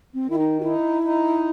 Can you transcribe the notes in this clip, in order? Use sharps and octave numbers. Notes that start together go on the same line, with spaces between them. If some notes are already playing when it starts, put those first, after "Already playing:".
C4
D#3 E4
D#4
F#4
D#4 E4
D#4